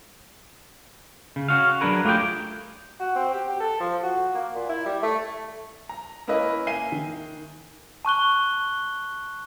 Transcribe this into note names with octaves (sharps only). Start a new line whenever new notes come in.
C#3
C#4 F#4 F5
F#3 D4 G#4 A#4 B4
A3 F4 G4 G#4 G5
F#4
C4
G4
G4
A4
F3
F#4
A#3
A#2
E4
G3
A3
A#5
A#3 C#4 E4 B4 D#5
A#3 E5 G#5 C7 D#7 G7
D#3
A5 C#6 F#6 G7